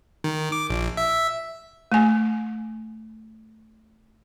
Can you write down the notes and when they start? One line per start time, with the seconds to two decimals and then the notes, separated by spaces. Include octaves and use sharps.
0.24 D#3
0.52 D6
0.70 A#1
0.97 E5
1.92 A3 G#5